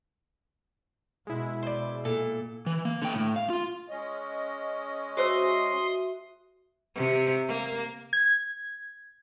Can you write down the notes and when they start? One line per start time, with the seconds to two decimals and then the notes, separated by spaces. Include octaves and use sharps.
1.27 B2 G#3 E4
1.63 C5 D5
2.05 A#2 A4
2.66 E3
2.85 A#3
3.02 D3 G5
3.14 A2
3.36 F5
3.50 F4
3.89 G#3 C#4 D#5
5.17 F#4 G#4 C5 E5 C6 D#6 E6
6.95 C3
7.48 A#3
8.13 G#6